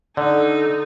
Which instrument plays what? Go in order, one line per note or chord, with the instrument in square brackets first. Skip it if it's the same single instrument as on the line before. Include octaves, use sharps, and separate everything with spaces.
[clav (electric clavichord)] D3 [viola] D#4 A4 [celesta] D5